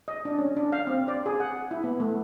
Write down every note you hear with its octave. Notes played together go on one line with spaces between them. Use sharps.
D#5
D4
C#4
D4
F5
C4
D5
G#4
F#5
E4
B3
A3